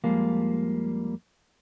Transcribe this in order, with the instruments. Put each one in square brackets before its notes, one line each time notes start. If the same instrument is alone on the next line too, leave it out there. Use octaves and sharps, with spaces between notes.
[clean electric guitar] F2 F3 G3 G#3 A#3 F4